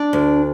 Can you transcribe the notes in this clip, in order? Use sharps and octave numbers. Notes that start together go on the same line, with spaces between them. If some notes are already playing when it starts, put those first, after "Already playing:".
Already playing: D4 D5
D2